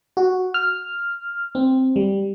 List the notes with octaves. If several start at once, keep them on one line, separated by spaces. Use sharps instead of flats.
F#4
F6
C4
G3